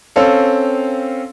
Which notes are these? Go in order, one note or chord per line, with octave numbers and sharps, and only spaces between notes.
C4 C#4 A4 F5